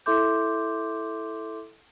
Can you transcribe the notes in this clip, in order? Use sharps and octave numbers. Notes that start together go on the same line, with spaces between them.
E4 A4 E5 C6 D6 G6